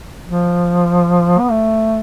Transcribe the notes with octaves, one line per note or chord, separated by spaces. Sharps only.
F3
B3
A3